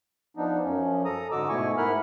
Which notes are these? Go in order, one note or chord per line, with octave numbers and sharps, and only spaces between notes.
F3 B3 D4 D#4
F#2 F3 C#4
A4 A#5 D#6
G#2 D3 F#4 D#5 D6 E6
G#2 B2 A3 E4 G#5 C#6
G#2 E4 A#4 F#5 B5 F6